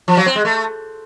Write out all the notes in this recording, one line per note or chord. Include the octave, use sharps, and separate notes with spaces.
F3
F#3
C4
G#3
A3